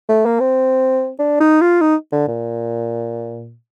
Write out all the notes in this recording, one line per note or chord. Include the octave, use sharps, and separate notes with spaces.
A3
A#3
C4
D4
D#4
F4
D#4
D3
A#2